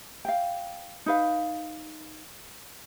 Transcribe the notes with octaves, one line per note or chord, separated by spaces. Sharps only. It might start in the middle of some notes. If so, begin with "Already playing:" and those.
F5 G5
D#4 B4 F5